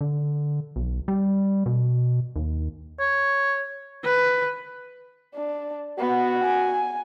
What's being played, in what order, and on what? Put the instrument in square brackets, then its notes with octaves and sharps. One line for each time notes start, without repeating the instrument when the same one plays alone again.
[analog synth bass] D3
B1
G3
B2
D#2
[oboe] C#5
[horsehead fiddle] B4
[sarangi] D4
[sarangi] B3 [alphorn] F#4
[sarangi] G#5